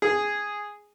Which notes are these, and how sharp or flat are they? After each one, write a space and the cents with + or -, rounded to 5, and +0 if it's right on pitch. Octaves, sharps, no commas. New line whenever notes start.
G#4 -5